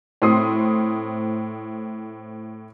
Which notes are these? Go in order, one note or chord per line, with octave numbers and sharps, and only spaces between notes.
A2 C4 C6 D#6 C7